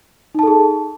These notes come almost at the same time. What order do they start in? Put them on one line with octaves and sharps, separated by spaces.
D#4 A5 A4 G#4